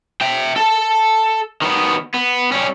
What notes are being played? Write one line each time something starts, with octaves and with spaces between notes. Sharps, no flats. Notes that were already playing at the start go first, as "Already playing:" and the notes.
E5 G5
A4 A5
D#3 B3
B3
G3 C#4